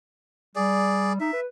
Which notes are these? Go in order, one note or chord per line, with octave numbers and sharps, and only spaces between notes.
G3 G#4 D5
D#4 E5
B4